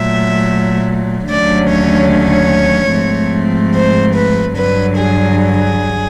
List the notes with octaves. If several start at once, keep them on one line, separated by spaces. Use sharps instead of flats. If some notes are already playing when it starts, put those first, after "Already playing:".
Already playing: A#2 F#3 A3 E5
D#2 D3 F#3 A3 C#4 D5
C#5
C#5
G#2 F3 A3 C4
C5
B4
G2 D3 F#3 B4
G#4
G#4